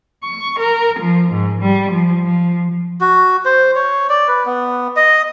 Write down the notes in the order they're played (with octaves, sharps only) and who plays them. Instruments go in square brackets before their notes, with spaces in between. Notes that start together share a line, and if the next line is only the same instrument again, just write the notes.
[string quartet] C#6
A#4
F3
G#2
G3
F3
F3
[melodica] F#4
C5
C#5
D5
B4
B3
D#5